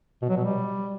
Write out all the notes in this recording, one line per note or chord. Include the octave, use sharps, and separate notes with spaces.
B2
F#3
B2
G3